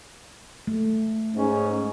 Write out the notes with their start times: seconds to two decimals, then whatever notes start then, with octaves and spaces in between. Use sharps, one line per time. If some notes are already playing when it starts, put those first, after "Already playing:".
0.67 A3
1.35 G#2 C#4